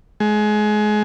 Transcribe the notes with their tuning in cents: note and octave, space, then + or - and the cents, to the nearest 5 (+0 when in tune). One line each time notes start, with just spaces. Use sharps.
G#3 +25